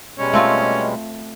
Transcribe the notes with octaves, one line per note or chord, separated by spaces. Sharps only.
B2 G3 G#3 C#4
A3 C4 F4